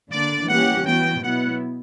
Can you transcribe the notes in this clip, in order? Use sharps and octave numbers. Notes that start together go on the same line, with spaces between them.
D3 A#3 D4 D5
E3 G3 A#3 C#4 G4 F#5
E3 B3 F#4 G5
B2 F#3 B3 E4 F#5